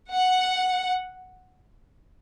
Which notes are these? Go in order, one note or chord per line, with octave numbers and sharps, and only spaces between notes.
F#5